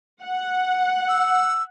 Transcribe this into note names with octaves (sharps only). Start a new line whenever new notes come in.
F#5
E6